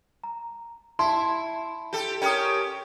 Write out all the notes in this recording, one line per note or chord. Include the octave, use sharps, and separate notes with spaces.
A#5
E4 A5 C6
G4 A4
C#4 G4 A#4 G5 D#6